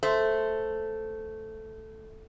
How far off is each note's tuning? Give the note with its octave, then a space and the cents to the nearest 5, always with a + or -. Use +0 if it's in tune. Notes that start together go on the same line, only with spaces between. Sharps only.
A3 +0 C5 +0